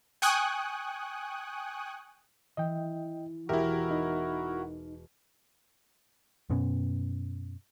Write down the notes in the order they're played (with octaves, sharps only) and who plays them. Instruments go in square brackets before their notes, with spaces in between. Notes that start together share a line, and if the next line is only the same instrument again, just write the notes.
[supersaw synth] G5 G#5 C#6 D#6 F#6
[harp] E3 [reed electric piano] D#5 G5
[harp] E1 F6 [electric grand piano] E4 A#4 [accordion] F#4 [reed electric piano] G4 E5
[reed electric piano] D#4
[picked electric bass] F#2 B2 B3 C#4